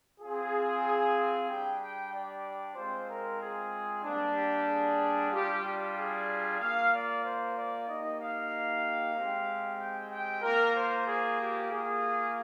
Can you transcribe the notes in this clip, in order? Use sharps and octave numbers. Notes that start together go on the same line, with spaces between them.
C4 F4 G#4
G3 D4 G4 G5
G5
D5
G#3 C4 F4 C5
A#4
G#4
G3 A#3 D4
G4
G#4
G3 D4 F4 G4
G4
G#4
A#3 F4 F5
D5
C5
D5
A#3 D#4 G4 D#5
F5
G#3 C4 G4
G5
G5
A#3 F4 A#4
C5
G#4
G4
A#3 F4 G#4